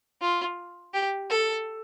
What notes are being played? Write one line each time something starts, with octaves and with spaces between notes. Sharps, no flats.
F4
G4
A4